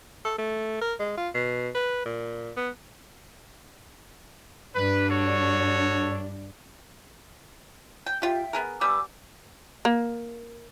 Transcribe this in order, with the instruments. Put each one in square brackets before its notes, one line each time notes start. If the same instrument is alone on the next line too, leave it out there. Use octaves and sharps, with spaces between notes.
[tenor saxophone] A4
A3
A#4
G#3
F4
B2
B4
A#2
B3
[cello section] G2 D4 [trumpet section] B4
[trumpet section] F#4 A4 C#5
[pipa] G5
[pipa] F4 G4 [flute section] E5 G5
[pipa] B3 G#4 A#4
[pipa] G3 B3 [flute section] G#5 D6 E6
[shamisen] A#3